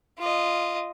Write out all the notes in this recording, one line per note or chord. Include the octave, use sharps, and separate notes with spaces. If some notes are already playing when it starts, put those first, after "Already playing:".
F4 D#5